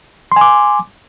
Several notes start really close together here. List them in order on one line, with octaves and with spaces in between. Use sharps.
C6 G#5 D6